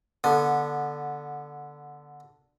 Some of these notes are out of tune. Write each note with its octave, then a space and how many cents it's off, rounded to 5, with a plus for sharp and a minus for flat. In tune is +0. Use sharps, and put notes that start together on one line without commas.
D3 +0 B3 -25